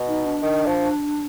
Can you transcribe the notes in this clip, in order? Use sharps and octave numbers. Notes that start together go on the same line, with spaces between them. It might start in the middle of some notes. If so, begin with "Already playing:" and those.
Already playing: B2
D#4
D4
D#3
F3